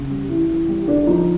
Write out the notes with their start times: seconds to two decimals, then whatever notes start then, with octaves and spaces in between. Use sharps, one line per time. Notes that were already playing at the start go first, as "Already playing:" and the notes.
Already playing: C#3 C#4
0.10 G3
0.29 E3
0.48 E3
0.68 G3
0.87 D3 D4
1.07 F3 D#4